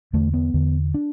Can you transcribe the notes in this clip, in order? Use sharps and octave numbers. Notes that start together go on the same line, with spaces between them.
E2 D3 A3
B3
E2 D3
D4